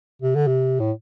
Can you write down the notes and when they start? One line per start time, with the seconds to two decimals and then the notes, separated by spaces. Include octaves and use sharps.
0.22 C3
0.35 D3
0.47 C3
0.80 A2